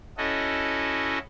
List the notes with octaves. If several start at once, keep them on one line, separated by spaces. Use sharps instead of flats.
C#4 E4 F#4 A4 D#5